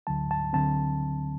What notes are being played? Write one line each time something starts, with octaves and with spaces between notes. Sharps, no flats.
D2 D3 F#3 A5
A5
D2 D3 F#3 C4 A5